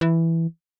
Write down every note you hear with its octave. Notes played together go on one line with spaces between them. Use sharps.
E3